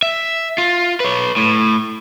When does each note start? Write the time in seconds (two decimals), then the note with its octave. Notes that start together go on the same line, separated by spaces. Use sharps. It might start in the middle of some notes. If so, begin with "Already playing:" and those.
0.03 E5
0.58 F4
1.00 B4 C#5
1.37 A2